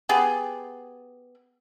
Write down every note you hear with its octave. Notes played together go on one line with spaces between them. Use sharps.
B3 G4 G#4